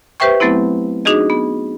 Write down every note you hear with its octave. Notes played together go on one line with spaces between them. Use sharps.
G4 B4 C5 E5 G5 C#6
F#3 A3 B3 C4 E4
D4 D#4 F#4 G#4 D#5
B3